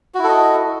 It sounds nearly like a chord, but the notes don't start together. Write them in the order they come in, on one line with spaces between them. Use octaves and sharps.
F#4 E4 A4 D#5